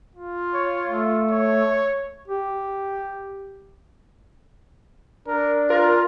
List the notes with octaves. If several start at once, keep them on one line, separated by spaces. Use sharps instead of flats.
F4
C#5
A3
C#5
G4
D4 A#4
F4 A#4